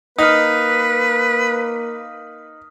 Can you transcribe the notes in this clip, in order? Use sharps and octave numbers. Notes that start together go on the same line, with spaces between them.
A#3 D#4 B4 D#6 F6